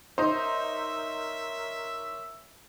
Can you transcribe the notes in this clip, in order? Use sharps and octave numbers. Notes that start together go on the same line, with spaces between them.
D#4 A#4 C5 C#5 E5